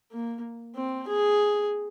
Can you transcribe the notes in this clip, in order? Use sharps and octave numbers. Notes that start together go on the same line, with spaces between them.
A#3
C4
G#4